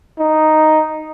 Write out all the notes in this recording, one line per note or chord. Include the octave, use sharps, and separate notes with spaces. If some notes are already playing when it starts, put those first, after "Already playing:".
D#4